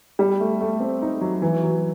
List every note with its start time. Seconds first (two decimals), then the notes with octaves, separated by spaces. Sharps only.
0.19 G3
0.40 A3
0.61 A3
0.80 C4
1.02 D#4
1.21 F#3
1.42 E3
1.63 F#3